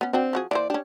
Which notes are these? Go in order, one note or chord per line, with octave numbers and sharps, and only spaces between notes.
B3 C#4
C4 D4 F#4 G5
F3 F#4 G#4
E3 A#3 C5 D5
C#4 D4 G4